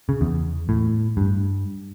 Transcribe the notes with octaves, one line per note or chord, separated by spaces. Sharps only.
C#3
E2
A2
G2